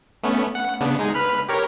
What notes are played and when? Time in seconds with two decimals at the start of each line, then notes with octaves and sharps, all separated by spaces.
0.23 A3 B3 C#4
0.55 F#5
0.81 C#3 B3 D4
0.99 G#3 D#4 G#4
1.14 B4 B5 F6
1.49 G4 A#4 C#5